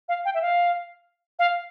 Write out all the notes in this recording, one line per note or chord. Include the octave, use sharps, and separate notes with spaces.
F5
G5
E5
F5
F5